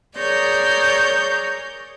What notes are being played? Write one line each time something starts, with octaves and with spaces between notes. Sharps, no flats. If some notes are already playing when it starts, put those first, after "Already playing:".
G#4 A#4 C#5 D5 G6